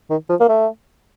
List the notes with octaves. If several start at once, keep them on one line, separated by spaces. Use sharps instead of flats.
D#3
F3
A#3
A3